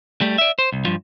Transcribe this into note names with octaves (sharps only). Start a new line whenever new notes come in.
G3 A3
D5 E5
C5
C2
G2 F3